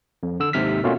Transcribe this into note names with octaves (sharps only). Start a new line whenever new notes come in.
F2
D3 E6
D#2 G#2 C3 F6 B6
B2 A3 A#3 C#4 F4 F#4